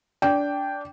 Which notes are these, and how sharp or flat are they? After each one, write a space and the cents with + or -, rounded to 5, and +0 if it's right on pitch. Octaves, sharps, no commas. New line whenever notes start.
D4 -20 G5 +0